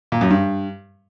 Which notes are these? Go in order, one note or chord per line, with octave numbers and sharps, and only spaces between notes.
A#2
F#2
G2